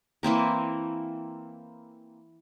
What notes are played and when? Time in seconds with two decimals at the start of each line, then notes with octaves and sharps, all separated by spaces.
0.23 E3 A#3 C4 A#4